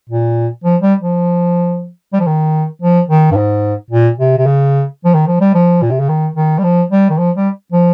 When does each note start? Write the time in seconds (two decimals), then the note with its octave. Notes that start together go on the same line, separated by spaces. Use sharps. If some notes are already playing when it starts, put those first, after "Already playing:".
0.10 A#2
0.64 F3
0.82 G3
1.00 F3
2.13 G3
2.20 F3
2.27 D#3
2.82 F3
3.09 D#3
3.32 G2
3.37 G#2
3.91 A#2
4.18 C3
4.38 C3
4.46 C#3
5.05 F3
5.14 D#3
5.27 F3
5.41 G3
5.55 F3
5.82 A#2
5.91 C3
6.00 C#3
6.09 D#3
6.36 D#3
6.59 G3
6.64 F3
6.91 G3
7.10 D#3
7.18 F3
7.36 G3
7.72 F3